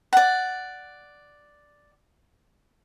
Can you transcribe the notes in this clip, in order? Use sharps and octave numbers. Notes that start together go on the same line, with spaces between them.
D5 F#5